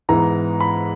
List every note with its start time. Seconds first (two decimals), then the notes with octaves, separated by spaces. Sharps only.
0.09 G#2 E3 B3 A#5
0.60 B5